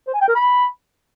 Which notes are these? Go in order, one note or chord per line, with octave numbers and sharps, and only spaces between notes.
C5
G#5
G5
A#4
B5